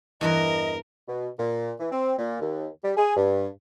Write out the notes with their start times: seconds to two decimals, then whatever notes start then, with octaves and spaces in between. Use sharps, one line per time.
0.21 E2 G2 E3 A#4 D#5
1.08 B2
1.39 A#2
1.80 E3
1.92 C4
2.18 A#2
2.41 D#2
2.83 G3
2.97 G#4
3.16 G2